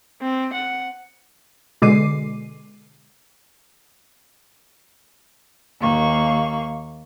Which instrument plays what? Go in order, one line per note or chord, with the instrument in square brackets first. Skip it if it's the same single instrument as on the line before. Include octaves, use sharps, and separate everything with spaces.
[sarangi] C4
F#5
[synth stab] B2 D3 G#3 D6 C7 D#7
[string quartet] D#2 A#3 C#6